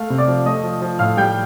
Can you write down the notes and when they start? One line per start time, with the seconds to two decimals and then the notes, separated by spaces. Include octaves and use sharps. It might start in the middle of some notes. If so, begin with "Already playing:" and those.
Already playing: A3 F5 F6
0.10 C3
0.18 D5 D6
0.28 F3
0.46 A3 D#5 D#6
0.63 F3
0.82 F3
0.99 A2 F5 F6
1.17 G3 G5 G6